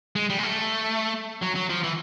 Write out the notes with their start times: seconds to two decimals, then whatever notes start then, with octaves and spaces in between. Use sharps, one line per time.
0.16 G#3
0.30 G3
0.38 G#3
0.43 A3
1.42 F#3
1.55 F#3
1.69 F3
1.83 E3